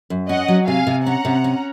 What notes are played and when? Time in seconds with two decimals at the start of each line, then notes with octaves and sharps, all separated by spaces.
0.10 F#2
0.29 C#4 D#5 F#5
0.48 F#3
0.68 C3 F5 G#5
0.87 C3
1.05 C#4 F#5 A#5
1.25 C3
1.44 C#4